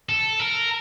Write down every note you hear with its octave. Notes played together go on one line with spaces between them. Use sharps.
A4
A#4